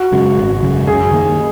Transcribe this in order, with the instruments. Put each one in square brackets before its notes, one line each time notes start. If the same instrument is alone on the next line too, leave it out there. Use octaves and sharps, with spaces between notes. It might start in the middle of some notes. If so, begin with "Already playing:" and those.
Already playing: [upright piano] F#4
[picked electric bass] F#2 C#3 G#3
G#1
F#2 C#3 G#3
[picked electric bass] F#2 [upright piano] G#4
[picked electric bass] D#3 A#3